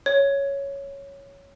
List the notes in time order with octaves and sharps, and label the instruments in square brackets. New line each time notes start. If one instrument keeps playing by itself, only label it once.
[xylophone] C#5